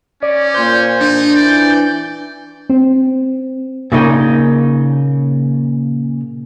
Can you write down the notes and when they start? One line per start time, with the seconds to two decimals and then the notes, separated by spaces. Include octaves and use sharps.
0.23 C#4 D5
0.54 A#2 C5 G6
1.00 D4 D#4
1.36 E3 D5
2.70 C4
3.92 A#2 C#3 D#4 A#4 G5